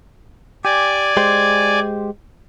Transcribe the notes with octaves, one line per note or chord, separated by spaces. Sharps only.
G4 D5 G#5
G#3 G4 C5